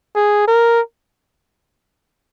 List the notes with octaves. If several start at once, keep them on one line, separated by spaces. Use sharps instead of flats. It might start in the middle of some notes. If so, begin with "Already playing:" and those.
G#4
A#4